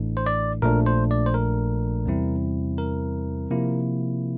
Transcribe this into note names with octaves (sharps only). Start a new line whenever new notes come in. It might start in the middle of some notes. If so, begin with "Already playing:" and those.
Already playing: A1 A2 E3 A3 D4
C5
D5
A#1 A#2 F3 A3 D4 A#4
C5
D5
C5
A#4
E2 C3 G3 C4 E4
A#4
C3 F3 A#3 E4